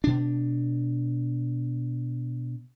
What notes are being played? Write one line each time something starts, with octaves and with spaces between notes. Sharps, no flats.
B2 D4